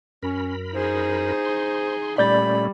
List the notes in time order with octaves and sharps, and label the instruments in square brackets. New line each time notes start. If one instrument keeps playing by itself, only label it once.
[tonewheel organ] F#2 A#4 B5 [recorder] C#4
[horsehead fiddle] D#4 G#4 [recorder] C5
[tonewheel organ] C6
[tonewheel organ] A#2 A3 C#4 [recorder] G3 [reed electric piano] D5 G6 A6 [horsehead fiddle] B5